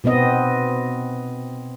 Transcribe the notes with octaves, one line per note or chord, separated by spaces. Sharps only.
B2 B3 C4 D#5